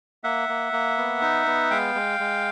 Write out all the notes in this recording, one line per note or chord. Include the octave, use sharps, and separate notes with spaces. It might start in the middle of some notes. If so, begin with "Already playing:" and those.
A#3 E5 F#5
A#3
A#3
B3
D#4
B3
G#3 F5 G5
G#3
G#3